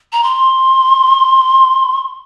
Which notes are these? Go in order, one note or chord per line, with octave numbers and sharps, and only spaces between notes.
A#5
C6